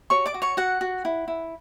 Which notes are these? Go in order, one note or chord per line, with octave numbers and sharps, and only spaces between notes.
F#4 C#5 C#6
D5 D6
F#4
C#5 C#6
F#4 F#5
F#4
E4
E4